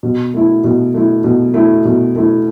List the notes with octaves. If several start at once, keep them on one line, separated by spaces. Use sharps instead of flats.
B2
A3 E4
B2
A3 E4
B2
A3 E4
B2
A3 E4